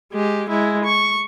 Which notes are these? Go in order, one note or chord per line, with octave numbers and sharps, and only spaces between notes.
G#3 G4
G#3 E4
C#6